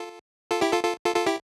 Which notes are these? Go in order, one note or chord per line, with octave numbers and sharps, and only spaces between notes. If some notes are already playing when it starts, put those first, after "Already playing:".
Already playing: F4 A4
F4 A4
E4 G4
F4 A4
F4 A4
F4 A4
F4 A4
E4 G4